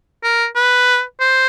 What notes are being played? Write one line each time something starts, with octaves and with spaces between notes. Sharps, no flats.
A#4
B4
C5